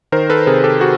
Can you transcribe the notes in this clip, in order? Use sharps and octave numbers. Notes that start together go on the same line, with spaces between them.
D#3 A#4 C5
A4 B4
C3 G#4 A#4
G4 A4
F#4 G#4